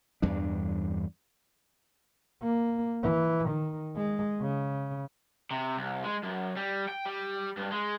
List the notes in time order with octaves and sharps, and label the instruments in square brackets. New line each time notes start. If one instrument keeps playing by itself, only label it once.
[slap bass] E2 G2 D4
[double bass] A#3
E3
D#3
G#3
C#3
[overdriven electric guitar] C3
C2
G#3
F#2
G3
G5
G3
G2
G#3